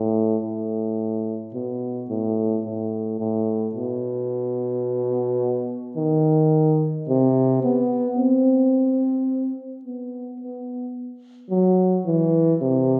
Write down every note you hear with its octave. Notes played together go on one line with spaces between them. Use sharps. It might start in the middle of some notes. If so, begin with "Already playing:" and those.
Already playing: A2
A2
B2
A2
A2
A2
B2
D#3
C3
B3
C4
B3
B3
F#3
E3
C3